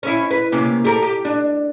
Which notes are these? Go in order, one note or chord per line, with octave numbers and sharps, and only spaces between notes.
C#4 E4
B4
C3 A#3 C#4
G4 A4 A#4
G4
D4